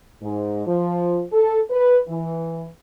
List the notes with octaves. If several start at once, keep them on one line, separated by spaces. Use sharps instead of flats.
G#2
F3
A4
B4
E3